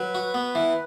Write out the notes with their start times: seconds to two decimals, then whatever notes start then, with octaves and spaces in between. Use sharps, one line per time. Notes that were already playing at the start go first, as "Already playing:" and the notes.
Already playing: F#3 B4
0.15 F#4
0.34 B3
0.55 E3